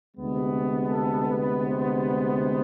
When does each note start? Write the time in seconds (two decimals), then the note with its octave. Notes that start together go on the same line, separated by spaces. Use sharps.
0.16 D2 C3 G#3 B3
0.90 A4
1.26 B4
1.63 C5